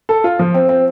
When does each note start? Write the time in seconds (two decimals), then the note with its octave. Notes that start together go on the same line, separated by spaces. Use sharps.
0.09 A4
0.24 F4
0.39 F3
0.54 C4
0.69 C4